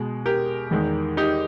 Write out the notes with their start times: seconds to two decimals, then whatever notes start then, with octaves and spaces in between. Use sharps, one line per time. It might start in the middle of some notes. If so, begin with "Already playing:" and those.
Already playing: B2 G#3
0.26 G4 A#4
0.71 E2 D#3 G#3
1.17 D#4 G4